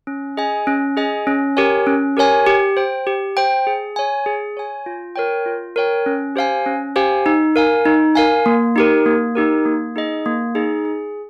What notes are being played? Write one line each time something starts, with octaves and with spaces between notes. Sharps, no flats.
C#4
G#4 D#5 G#5
C#4
G#4 D#5 G#5
C#4
G4 A#4 C#5 G#5
C#4
G4 A#4 C#5 G#5
G4
C5 G5
G4
C5 G5
G#4
C#5 G#5
G#4
C#5 G#5
F4
A#4 C#5 G5
F4
A#4 C#5 G5
C#4
G4 C5 F5 G#5
C#4
G4 C5 F5 G#5
D#4
A#4 F5 G#5
D#4
A#4 F5 G#5
A#3
D#4 G4 A#4
A#3
D#4 G4 A#4
A#3
D#4 G#4 D#5
A#3
D#4 G#4 D#5
G#4